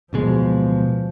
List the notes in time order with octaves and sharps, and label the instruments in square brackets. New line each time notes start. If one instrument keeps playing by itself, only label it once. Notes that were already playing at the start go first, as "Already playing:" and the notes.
[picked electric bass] D1 B2 G#3 [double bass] F3